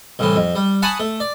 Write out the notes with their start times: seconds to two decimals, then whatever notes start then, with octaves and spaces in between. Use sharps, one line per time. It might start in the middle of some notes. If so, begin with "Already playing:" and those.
0.19 C2 A2 E3
0.36 F2
0.55 G3
0.82 F#5 G#5 A5 B5 C#6 D#6
1.00 A3
1.20 D5